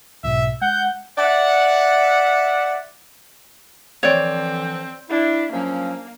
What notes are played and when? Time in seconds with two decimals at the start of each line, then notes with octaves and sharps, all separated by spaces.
0.24 B1 G#2 B2 E5
0.62 G#3 F#5 G6
1.18 D5 E5 F#5
4.03 D3 E3 F3 C4 C#5 D5
5.10 D4 E4
5.52 F3 F#3 A#3 C#4